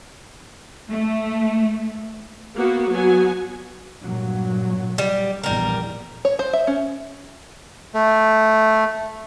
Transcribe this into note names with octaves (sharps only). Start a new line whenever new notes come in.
A3
A#3 B3 F#4
F#3 B3 F#4 G#5
G2 A#2 F#3
G3
A#1 E2 G3 A#4
C#5
C5
E5
C#4
A3